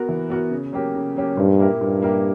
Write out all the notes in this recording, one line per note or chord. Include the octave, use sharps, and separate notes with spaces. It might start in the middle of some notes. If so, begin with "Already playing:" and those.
Already playing: B3 F#4 A#4
E3
B3 F#4 A#4
C#3
F#3 A#3 C#4 G4
C#3
F#3 A#3 C#4 G4
G2 A#2
A#3 E4 G4 A#4
G2 A#2
A#3 E4 G4 A#4